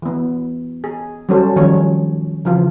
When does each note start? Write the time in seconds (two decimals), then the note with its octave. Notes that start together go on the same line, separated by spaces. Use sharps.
0.02 E3 B3
0.84 G#4
1.29 F#3 G3 C#4 A4 C5
1.56 D#3 F3 G3 C#4 C#5
2.45 C#3 E3 F3 F4